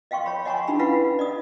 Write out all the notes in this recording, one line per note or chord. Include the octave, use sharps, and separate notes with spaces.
D#5 F5 G5 C6 C#6
C#5 B5
D#5 F#5 G#5 A#5 C6 C#6
D4 D#4 G4 G#5 B5
C#4 E4 B4 F5 F#5 B5
D5 D#5 D#6